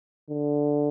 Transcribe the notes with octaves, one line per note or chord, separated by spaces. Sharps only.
D3